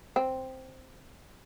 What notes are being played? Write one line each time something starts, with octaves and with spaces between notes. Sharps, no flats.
C4